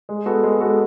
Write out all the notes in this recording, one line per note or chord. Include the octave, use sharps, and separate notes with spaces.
G#3
B3 F#4 A4
G#3
B3 F#4 A4